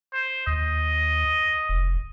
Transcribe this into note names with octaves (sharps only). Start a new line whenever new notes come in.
C5
D#2 D#5
F1